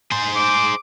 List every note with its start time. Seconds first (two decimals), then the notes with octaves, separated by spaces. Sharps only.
0.12 G#4 C5
0.36 D6